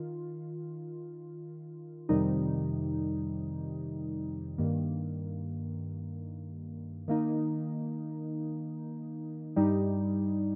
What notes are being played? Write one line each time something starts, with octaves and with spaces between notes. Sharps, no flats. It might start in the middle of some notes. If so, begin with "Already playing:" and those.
Already playing: D#3 F4
F2 C3 D#3 G3 D#4
G2 D#3 A#3
D#3 A#3 D#4
G2 G3 D#4